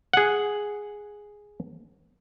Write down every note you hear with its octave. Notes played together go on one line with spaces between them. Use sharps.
G#4 F#5